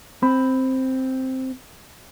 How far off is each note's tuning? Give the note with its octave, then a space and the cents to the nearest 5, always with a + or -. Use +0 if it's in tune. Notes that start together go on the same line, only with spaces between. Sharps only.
C4 +0 B5 +10